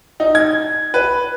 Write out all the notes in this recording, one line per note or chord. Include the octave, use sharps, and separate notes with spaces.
D#4
G#6
B4